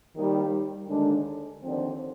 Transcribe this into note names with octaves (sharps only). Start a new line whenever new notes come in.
D#2 D#3 G3
D#2 D3 G#3 D4
D#2 D3 F3 C4